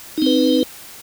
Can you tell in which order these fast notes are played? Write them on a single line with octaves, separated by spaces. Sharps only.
D#4 C4 B4